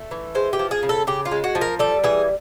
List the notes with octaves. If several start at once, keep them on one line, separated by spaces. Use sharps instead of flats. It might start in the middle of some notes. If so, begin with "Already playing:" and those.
Already playing: A3
E3
G#3 C5
G4
F3
G#4
C#3
A4
C#3 G4
F4
G#3
F#4
F3
A#4
G3 A4
E3 G#4